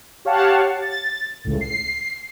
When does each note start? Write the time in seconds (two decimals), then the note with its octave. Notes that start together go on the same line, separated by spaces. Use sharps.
0.25 G4 C#5 F5 F#5 A5
0.82 A6
1.45 C#2 A2
1.61 C7